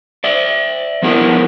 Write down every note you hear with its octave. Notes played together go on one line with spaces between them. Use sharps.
D5 E5
F3 B3 E4 G#4 A#4